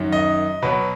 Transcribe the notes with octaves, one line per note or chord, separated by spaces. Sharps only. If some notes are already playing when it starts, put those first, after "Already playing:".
Already playing: F#2 D#3 F#3
D#5
B2 F#3 B4